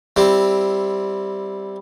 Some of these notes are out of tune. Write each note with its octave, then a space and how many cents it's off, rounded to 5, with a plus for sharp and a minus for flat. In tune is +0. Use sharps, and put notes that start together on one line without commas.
G3 +0 C4 +0 E4 +0